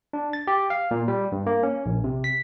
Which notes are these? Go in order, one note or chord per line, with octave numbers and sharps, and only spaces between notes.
D4
A6
G4
F5
A#2
G3
G2
A#3
C#4
A#1
C3
B6